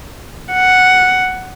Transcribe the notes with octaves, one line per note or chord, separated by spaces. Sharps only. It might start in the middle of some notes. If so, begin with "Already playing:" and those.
F#5